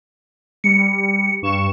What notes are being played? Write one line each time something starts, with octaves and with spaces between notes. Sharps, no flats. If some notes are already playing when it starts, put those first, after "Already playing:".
G3 C#7
G2 C#6 E7